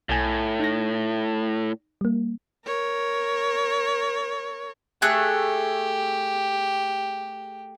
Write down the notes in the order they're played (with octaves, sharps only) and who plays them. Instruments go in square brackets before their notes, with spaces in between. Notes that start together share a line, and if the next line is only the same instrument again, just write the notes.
[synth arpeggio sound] B1 G#5 [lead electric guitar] A2
[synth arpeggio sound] D#4 A#6
G3 A#3
[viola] A#4 C#5
[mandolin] A3 G#4 F#6 [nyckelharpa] G4